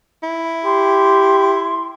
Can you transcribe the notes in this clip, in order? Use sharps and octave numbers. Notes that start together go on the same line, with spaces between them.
E4
G4 C6